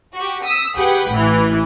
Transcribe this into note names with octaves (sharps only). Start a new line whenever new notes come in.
F#4 G4
D#6 E6 B6
G4 G#4 B4 F#5 G5
A1 E3